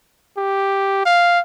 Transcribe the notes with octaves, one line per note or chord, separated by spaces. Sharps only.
G4
F5